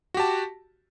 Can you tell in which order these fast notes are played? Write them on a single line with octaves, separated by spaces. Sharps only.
F#4 G4 A5